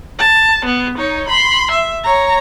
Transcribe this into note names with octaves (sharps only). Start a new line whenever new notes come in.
A5
B3
D#4 C#5
B5 C6
E5
C#5 A#5